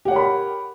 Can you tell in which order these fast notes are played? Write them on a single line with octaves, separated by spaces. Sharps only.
G4 F#5 C#5 A#4 B5